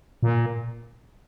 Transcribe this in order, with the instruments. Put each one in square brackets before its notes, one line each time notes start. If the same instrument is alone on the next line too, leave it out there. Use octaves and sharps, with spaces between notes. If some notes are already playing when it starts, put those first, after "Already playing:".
[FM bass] A#2